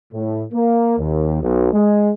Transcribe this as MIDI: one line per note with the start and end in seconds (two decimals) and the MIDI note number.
0.13 0.43 45
0.53 0.95 58
0.99 1.40 39
1.42 1.71 35
1.72 2.11 56